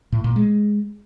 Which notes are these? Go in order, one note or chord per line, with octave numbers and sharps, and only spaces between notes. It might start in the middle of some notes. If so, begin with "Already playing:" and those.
A2
A#2
G#3